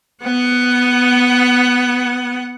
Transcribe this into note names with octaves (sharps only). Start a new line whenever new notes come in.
B3 F#5